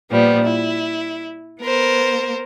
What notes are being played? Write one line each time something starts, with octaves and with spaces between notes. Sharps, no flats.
A#2 F3 G3 B3
E4
B3 A#4 C5